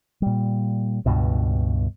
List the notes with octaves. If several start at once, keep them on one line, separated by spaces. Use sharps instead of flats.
A#2 G3
C#2 G2 B2